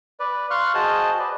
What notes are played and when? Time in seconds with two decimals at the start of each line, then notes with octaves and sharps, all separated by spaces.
0.20 B4 D5
0.50 F5 C6 C#6 F6 F#6
0.74 F#4 G#4 C5 D#5 A5
1.19 B4 D5